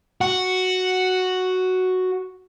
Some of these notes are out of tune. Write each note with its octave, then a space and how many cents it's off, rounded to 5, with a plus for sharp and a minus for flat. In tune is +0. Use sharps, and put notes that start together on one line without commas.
F#4 +0 F#5 +0